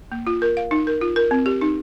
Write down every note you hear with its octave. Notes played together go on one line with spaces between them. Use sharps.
A#3
F4
A#4
F5
D#4
A#4
F4
A#4
C4
G4
D#4